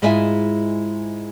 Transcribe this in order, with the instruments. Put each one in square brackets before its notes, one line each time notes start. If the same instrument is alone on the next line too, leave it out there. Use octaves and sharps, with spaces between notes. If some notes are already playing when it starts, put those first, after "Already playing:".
[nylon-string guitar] G#2 G#3 E4 F4 E5 G#5